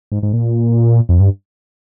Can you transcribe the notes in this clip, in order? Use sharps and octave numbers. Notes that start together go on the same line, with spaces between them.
G#2
G#2
A#2
F2
G2